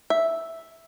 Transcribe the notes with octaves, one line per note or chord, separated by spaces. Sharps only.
E5